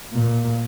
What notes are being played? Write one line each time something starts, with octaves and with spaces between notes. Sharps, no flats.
A#2